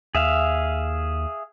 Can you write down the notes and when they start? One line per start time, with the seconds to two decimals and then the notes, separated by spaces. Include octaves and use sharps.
0.15 D#2 G#4 E5 F5